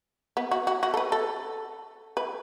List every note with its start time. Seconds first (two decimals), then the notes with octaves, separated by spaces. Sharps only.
0.37 B3
0.51 F#4
0.67 F#4
0.83 F#4
0.94 A4
0.97 B4
1.12 A4
2.17 B4